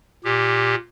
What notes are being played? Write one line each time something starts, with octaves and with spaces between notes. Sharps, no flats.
A#2 G4